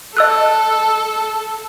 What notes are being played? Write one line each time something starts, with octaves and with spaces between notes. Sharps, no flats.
A4 D#5 E6 F#6